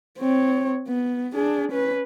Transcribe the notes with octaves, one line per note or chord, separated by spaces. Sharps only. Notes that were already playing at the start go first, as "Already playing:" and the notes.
C4 C#5
B3
D4 G#4
C#4 B4